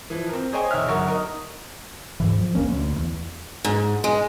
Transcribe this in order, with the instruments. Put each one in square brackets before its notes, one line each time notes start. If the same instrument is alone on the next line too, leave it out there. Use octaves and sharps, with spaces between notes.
[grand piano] E3 F3
C4 A#4
G#4 C5 C#5 D#5 G5 G#5
E1 D#4 E5 F6
G1 F#3 F#4 A#4 C#6
D#4 A#4
[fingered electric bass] D#1 G#2 E3
F3
E1 F#2 A#3 C#4
D2
E2
[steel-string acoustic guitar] G#2
G#3